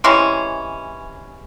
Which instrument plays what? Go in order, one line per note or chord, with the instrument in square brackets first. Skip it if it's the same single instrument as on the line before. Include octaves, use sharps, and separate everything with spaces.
[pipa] C3 E3 G#3 C#4